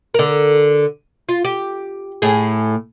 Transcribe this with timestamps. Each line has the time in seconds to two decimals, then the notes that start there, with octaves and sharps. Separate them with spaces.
0.14 D3 A#4
1.29 F4
1.45 G4
2.22 A2 G#4